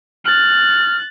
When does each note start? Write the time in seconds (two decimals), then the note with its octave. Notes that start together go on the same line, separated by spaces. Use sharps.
0.25 F6 F#6 A6